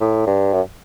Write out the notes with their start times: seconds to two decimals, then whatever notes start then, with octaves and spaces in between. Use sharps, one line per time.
0.01 A2
0.27 G2
0.53 F#2